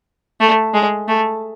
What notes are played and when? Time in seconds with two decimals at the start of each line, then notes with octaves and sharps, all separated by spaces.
0.40 A3
0.74 G#3
1.08 A3